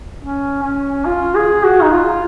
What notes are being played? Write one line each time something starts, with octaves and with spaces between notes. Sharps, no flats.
C#4
C#4
F4
G#4
F#4
D#4
F4